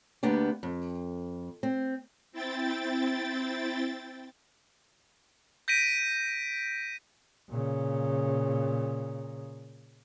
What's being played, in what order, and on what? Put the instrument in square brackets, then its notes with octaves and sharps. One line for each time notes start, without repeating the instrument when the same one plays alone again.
[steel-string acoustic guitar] D2 A#3 B3 D4 G4
F2
C4
[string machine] C4 E4 G5 A6
[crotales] G6 A#6 B6 D7 D#7
[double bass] A#2 C#3